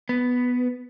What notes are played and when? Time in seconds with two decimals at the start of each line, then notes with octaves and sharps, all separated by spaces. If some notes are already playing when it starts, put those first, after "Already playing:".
0.09 B3